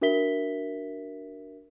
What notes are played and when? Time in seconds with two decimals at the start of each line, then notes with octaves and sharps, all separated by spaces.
0.01 D4 F#4 A#4 E5 B6 G7